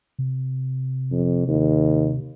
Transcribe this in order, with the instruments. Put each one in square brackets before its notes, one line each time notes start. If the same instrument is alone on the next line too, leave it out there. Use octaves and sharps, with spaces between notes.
[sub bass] C3
[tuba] F2
D#2